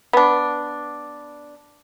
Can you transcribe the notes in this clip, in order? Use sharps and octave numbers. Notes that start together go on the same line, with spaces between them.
B3 D4